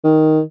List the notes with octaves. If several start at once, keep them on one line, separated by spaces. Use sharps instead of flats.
D#3